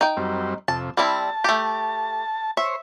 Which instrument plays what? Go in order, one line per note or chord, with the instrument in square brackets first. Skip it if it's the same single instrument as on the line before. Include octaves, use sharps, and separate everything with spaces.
[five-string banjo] D#4 G5
[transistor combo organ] F#2 G3 C4
[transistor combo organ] F2 C3 [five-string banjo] A5
[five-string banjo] G3 C4 E4 [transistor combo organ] A5
[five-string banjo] A3 G4
[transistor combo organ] C5 C#5 [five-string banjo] E5